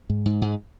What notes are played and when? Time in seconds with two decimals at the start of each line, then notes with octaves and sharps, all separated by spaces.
0.10 G#2
0.26 G#2
0.42 G#2